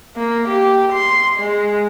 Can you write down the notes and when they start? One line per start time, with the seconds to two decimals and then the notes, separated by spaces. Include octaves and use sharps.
0.17 A#3
0.49 G4
0.93 C6
1.39 G#3